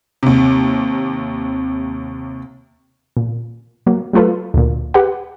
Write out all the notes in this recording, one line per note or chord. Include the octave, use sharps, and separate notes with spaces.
D#2 C3
A#2
F#3 A#3
F#3 A3 F4 A4 B4
D2 A#2
G4 B4 F#5